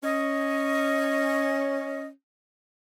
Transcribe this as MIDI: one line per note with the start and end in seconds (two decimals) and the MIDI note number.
0.03 2.09 61
0.03 2.06 75